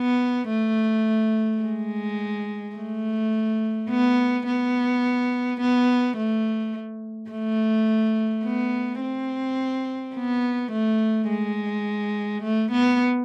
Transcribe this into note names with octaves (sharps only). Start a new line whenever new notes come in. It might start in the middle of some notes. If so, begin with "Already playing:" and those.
Already playing: B3
A3
G#3
A3
B3
B3
B3
A3
A3
B3
C4
B3
A3
G#3
A3
B3